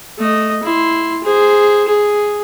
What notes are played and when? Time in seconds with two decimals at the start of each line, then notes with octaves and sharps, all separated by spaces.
0.19 A3 D#5
0.63 E4 C6
1.24 G#4 C5
1.88 G#4